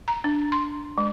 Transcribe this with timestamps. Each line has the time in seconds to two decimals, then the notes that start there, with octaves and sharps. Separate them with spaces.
0.08 A#5
0.24 D4
0.52 C6
0.98 G#3